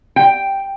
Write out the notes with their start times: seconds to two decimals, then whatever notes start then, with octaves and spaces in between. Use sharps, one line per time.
0.16 G5